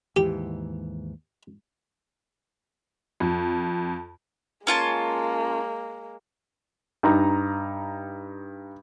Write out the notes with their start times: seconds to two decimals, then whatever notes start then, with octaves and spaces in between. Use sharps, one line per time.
0.16 D#2 G#2 E3 G4
3.20 F2
4.67 G#3 A#3 C#4 F4 A5
7.03 G2 D#4 A#5